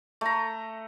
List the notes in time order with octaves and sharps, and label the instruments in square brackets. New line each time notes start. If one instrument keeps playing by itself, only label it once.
[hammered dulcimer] A3 A#5